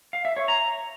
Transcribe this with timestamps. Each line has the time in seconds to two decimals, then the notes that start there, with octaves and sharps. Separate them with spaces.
0.13 F5
0.25 E5
0.37 C#5
0.48 A#5